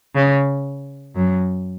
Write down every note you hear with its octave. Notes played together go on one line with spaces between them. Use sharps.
C#3
F#2